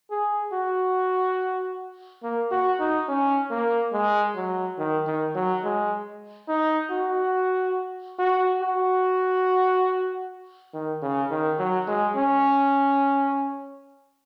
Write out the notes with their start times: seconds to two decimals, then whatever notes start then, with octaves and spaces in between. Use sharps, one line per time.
0.11 G#4
0.53 F#4
2.23 A#3
2.52 F#4
2.80 D#4
3.08 C#4
3.51 A#3
3.93 G#3
4.36 F#3
4.79 D#3
5.07 D#3
5.35 F#3
5.64 G#3
6.49 D#4
6.91 F#4
8.19 F#4
8.62 F#4
10.74 D#3
11.02 C#3
11.31 D#3
11.59 F#3
11.88 G#3
12.16 C#4